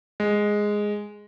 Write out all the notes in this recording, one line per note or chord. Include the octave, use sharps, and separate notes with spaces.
G#3